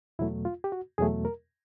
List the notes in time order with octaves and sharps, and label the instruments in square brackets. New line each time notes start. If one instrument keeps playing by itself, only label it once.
[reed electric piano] E2 B2 F#3 A3 E4
F4
G4
F#4
E2 B2 F#3 A3 G#4
A#4